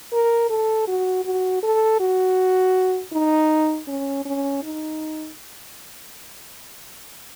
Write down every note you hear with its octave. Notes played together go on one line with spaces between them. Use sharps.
A#4
A4
F#4
F#4
A4
F#4
D#4
C#4
C#4
D#4